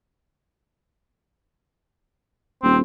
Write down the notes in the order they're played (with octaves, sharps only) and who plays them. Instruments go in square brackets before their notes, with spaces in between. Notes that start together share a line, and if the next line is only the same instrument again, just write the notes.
[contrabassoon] D#1 [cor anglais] C4